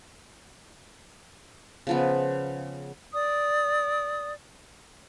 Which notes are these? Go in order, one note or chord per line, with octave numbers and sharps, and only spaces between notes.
C#3 F3 B3
D5 D#6